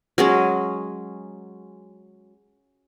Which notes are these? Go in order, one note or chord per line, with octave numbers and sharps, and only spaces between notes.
F#3 G#3 C#4